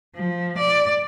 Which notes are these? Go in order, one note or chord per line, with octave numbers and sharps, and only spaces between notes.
F3
D5